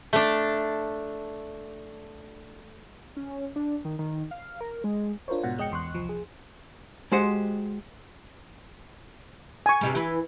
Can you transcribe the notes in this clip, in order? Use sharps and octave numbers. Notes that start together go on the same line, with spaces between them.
A3 D4
C#4
D4
D#3
D#3
F5
A#4
G#3
D4 F4 A#4 C5 C#5
G#2 B2 F#5
F2 G#3 D#5 G5 C#7
E2 C6 C#6 F#6
C2 F3
G#4
G#3 F#4 G4 C5 D#5 F#5
G#5 C#6
G2 C3 G3
E3 E4 B4